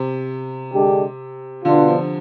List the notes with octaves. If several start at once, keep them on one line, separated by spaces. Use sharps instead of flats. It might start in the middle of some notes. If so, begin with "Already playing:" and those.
Already playing: C3
D3 G#3 D4 G4
B2 D3 B3 D4 F4
F3